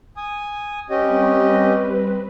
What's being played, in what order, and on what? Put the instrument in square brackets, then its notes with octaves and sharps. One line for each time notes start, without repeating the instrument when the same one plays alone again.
[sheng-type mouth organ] G#5 D#6
[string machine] G3 C4 B4 [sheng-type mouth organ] C#4 G4 D#5